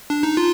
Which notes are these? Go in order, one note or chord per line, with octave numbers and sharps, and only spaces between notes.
D4
D#4
F4